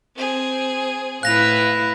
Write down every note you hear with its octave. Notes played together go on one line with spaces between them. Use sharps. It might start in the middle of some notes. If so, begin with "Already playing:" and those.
C4 G#4
A2 E4 B4 F5 F#6 A#6 F7